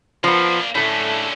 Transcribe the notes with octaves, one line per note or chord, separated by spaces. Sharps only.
F3 A#3 B3 D4
A2 D3 A3 C#4